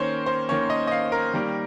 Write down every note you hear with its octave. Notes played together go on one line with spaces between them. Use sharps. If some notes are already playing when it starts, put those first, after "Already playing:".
Already playing: D#3 A#3 C#4 C5 C#5
C5
D#3 A#3 C#4 C#5
D#5
D#5
F5
A#4
D#3 G3 A#3